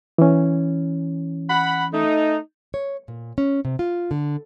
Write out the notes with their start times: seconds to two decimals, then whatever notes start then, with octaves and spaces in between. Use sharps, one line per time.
0.18 E3 C#4
1.49 F#5 B5
1.93 A3 D#4
2.74 C#5
3.08 A#2
3.38 C#4
3.65 C3
3.79 F4
4.11 D3